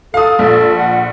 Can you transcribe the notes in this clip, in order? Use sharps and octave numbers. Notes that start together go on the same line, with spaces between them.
A4 F5 D#6
A#1 A4
F#5